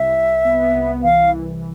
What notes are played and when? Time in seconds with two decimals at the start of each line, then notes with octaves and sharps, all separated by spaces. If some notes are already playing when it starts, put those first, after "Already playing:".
Already playing: C2 E5
0.14 C2
0.45 B3
0.74 C2
1.03 E3 F5